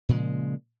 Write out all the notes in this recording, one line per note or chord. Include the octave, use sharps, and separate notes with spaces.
A#2 C#3 F3 G#3